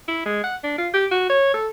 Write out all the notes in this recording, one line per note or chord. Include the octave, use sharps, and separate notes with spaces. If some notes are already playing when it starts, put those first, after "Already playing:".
E4
G#3
F#5
D4
F4
G4
F#4
C#5
A4